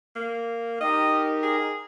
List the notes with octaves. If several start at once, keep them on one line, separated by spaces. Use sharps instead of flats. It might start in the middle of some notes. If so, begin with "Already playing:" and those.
A#3
D#4 G4 A#4 D#5
G#4